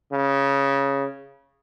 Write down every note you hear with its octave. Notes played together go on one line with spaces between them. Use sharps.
C#3